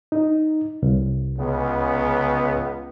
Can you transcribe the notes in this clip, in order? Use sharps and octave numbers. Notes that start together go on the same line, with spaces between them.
D#4
C2
C#2 C#3 B3